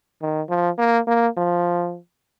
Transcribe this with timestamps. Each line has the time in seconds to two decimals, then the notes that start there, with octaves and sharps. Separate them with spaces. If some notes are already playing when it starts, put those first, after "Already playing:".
0.22 D#3
0.50 F3
0.78 A#3
1.07 A#3
1.37 F3